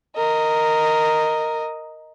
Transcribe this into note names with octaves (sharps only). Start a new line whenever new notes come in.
A#4 D#5